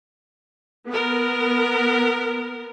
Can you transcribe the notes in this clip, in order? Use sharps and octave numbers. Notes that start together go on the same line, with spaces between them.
B3 A#4